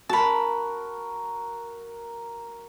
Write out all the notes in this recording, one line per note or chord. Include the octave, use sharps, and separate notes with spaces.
F#4 A#4 A5 B5